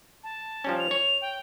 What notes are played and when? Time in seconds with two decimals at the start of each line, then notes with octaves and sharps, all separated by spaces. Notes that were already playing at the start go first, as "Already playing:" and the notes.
0.24 A5
0.64 F3 G3 C#4
0.79 F7
0.91 C#5
1.22 G5